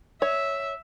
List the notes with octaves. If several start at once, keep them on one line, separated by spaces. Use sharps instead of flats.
C#5 E5